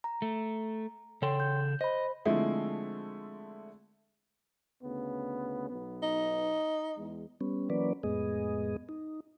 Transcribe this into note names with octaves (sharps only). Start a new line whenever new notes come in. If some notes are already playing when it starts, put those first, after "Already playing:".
A#5
A3
C#3 A4 C#5 G5 C6
G6
C5 D#5 B5
D3 F3 G#3 A3 C4 E4
D2 C#3 B3
B1 B3
D#4
E2 G#3
G3 B3 C#4
E3 F#3 A#3 C#4 B4 D5
F2 A2 G#3 B3 G#4 D#5
D#4